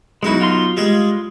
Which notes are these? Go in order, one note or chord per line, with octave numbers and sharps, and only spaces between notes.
B1 G#3 D#4 E4 F#4
F4 F5 C6
G3 G#3 G#4